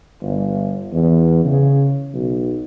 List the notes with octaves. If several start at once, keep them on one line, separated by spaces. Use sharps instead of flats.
G1
E2
C#3
B1